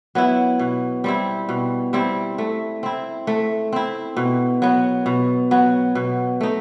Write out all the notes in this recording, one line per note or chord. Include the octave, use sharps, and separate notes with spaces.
F#3 B3 E4
B2
G3 C4 E4
B2
G3 C4 E4
A3
C4 E4
A3
C4 E4
B2
F#3 B3
B2
F#3 B3
B2
A3 D#4